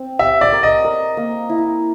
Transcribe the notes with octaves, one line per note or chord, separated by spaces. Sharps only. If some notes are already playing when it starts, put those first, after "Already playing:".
Already playing: C4
G4 E5
D5
A#4
D#5
A#4
A#3
E4